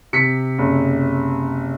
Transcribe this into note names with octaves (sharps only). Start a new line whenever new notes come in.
C3 B6 C#7
F#1